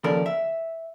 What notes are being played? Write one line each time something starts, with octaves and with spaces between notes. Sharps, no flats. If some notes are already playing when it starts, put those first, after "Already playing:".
D#2 C#3 F3 A4 A#4 D5
E5